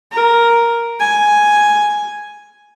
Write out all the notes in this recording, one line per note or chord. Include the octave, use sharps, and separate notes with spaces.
A#4
G#5